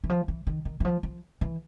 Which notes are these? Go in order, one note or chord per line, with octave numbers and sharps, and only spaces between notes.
E3
F3
E3
D#3
D#3
E3
F3
F3
E3